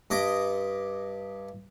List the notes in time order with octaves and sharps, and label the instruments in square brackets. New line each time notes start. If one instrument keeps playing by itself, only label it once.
[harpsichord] G2 D#5 D6 D#6